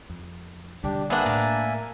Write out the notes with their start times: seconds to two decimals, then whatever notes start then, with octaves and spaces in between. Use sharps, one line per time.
0.10 F2
0.84 B1 D3 G3 D4 G4
1.10 A#3 B3 D4 C5 E5 F#5 G#5
1.26 A2 A#4 A5